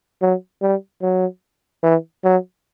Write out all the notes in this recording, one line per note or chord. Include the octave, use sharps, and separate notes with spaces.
F#3
G3
F#3
E3
F#3